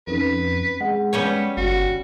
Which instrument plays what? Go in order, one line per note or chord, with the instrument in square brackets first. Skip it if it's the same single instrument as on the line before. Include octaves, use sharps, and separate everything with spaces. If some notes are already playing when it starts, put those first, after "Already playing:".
[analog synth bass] F2 [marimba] C4 C#4 D#4 [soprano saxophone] B4
[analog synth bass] G#3 [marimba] F#5
[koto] G3 C#4 C#5 [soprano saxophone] B3
[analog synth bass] G1 [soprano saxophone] F#4